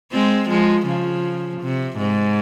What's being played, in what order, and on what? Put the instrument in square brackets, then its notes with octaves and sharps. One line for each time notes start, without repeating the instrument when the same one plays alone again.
[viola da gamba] G#3 C4
F3 G#3
C#3 F3
C3
G#2